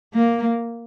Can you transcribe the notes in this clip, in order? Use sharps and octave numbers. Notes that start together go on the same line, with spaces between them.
A#3